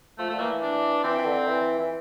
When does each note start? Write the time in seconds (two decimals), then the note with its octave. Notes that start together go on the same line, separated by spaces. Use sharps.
0.19 F3 A3
0.30 D3 A3
0.40 E3 A#3
0.62 D4
1.03 E3 C4
1.18 E3
1.25 D3
1.47 E3
1.79 E3